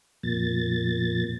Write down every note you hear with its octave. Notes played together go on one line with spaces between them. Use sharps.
F2 A#2 A6